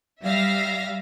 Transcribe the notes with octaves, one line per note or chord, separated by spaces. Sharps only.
G3 E5 F5 A#6